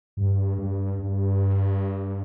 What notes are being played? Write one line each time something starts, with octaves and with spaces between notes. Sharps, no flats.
G2
G2
G2